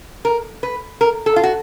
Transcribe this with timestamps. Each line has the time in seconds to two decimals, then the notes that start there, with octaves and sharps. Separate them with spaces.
0.25 A#4
0.63 B4
1.01 A#4
1.26 A4
1.36 F4
1.43 F#4